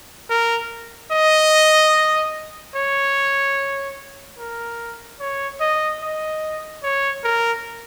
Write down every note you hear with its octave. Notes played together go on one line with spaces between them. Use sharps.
A#4
D#5
C#5
A#4
C#5
D#5
D#5
C#5
A#4